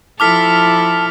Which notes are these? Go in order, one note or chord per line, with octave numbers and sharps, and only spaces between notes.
F3 E4 A4 A5 D6 F6 B6